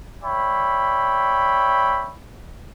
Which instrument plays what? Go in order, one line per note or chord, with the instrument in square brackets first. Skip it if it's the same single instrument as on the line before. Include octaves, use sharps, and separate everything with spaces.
[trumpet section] C#5 D5 E5 G5 B5